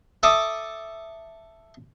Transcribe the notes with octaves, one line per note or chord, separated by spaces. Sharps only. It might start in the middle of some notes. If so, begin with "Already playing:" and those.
A4 E5 A5 D6 D#6